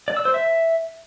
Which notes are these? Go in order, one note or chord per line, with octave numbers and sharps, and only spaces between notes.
D5
E6
C5
E5